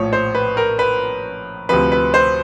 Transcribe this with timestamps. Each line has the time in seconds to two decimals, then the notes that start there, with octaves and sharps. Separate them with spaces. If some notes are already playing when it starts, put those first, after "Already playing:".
Already playing: A#1 A2 F3 C#5
0.13 C5
0.35 B4
0.57 A#4
0.79 B4
1.69 D2 C3 F3 B4
1.92 B4
2.14 C5